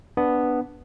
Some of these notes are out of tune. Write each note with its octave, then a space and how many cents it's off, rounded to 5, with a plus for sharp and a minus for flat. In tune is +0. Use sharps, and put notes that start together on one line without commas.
B3 +0 D4 +0